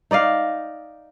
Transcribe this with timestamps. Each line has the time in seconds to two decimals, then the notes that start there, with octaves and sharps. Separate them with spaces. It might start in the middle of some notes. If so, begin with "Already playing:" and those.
0.11 D#4 D5 D#5 F5